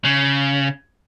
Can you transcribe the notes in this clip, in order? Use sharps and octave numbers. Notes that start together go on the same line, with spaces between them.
C#3